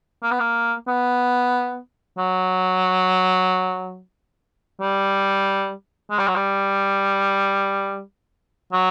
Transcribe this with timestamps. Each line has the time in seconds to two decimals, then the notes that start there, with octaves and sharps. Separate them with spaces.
0.23 A#3
0.31 B3
0.40 A#3
0.88 B3
2.18 F#3
4.81 G3
6.11 G#3
6.19 G3
6.27 F#3
6.36 G3
8.73 F#3